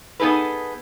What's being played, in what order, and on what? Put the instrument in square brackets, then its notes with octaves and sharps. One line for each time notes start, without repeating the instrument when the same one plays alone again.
[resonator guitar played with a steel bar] B3 D#4 G#4 A4 B4